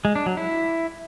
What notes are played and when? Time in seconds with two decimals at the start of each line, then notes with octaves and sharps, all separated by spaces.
0.05 G#3
0.15 D4
0.26 F#3
0.37 E4